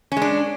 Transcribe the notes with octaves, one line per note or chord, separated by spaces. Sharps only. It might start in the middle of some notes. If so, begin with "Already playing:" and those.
G#3 C#4 D4